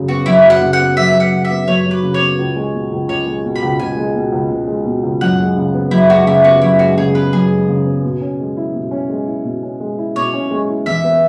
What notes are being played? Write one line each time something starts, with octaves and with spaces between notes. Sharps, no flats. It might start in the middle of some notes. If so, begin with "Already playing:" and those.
Already playing: F#2 C#3 F#3
B3 F#4
F#2 E4
F#3
F#5
C#3
F#5
B3
F#2 E5
F#3
F#5
C#3
E5
B3
F#2 C#5
F#3
B4
C#3
C#5
B3
C#2
G#3
B2
C#2
C#2 C#5
G#3
B2
B5
C#2
C#2 G#5
G#3
B2
C#2
C#2
G#3
B2
C#2
F#2 F#5
G#3
C#3
B3
F#2 E4
G#3 F#4
C#3 E4
B3 F#4
F#2 E4
G#3 F#4
C#3 G#4
B3 B4
F#2 G#4
G#3
C#3
B3
B2
C#4
G#3
E4
B2
C#4
G#3
E4
B2
C#4
G#3
E4
B2 C#5
C#4
G#3
E4
E2 E5
B3